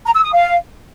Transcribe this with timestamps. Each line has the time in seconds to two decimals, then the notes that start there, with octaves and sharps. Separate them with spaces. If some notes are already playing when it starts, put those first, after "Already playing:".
0.05 A#5
0.14 E6
0.24 D#6
0.33 F5